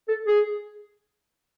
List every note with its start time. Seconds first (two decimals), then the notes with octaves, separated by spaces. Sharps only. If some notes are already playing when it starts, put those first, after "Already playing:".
0.08 A4
0.27 G#4